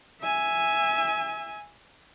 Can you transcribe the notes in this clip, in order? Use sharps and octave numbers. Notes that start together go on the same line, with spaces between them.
E5 G#5